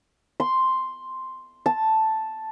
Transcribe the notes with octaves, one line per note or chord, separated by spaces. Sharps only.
C6
A5